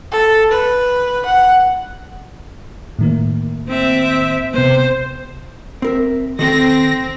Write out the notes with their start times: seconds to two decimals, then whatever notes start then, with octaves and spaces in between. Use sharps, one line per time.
0.11 A4
0.51 B4
1.25 F#5
2.99 A2 D#3 A#3
3.68 C4 E5
4.54 C3 B3 C5
5.82 C4 A#4 E5
6.39 D#3 C4 A4 A#6